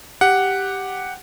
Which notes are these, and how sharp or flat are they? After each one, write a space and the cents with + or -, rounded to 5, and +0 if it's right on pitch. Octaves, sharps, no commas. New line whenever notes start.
G4 +0 F#5 +0